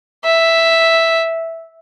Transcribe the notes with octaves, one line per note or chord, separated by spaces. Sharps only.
E5